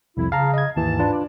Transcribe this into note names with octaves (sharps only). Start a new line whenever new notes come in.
C2 F2 E4
C#3 F5 A5 A#5
D#5 G#6
D#2 G#2 E3 A5
D4 F4 B4
D5